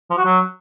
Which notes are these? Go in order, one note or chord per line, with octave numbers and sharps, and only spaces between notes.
F3
F#4
F#3